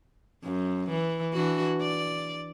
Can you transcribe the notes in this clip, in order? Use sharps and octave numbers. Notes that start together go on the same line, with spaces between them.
F#2
E3
E3 D4 F#4
D5